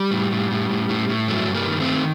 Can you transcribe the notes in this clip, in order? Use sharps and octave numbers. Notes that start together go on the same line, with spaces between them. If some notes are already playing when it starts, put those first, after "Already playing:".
Already playing: G3
A2
A2
A2
A2
A2
A2
G2 F#3 A3
G2
G3 A#3
D#3
A3 C4
D#3